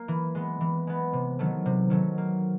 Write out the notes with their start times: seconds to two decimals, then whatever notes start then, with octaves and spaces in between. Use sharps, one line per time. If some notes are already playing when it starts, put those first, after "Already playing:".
Already playing: A#3
0.08 E3
0.35 G#3 B3
0.61 E3
0.87 G#3 B3
1.13 C3
1.39 D#3 F#3 A3
1.66 C3
1.90 D#3 F#3 A3
2.18 A#3